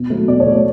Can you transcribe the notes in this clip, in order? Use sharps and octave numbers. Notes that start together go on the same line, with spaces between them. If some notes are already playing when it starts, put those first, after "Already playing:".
Already playing: B2
F#3 A3
B2 D5
C#5
F#3 A3
C#5